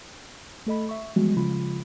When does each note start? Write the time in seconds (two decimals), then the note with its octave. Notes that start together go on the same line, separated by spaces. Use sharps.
0.66 A3 A4 D#5 B5
0.89 E5 C#6
1.16 E3 F3 G3 G#3 B3 F#4
1.37 C#3 F3 G#3 F4 B5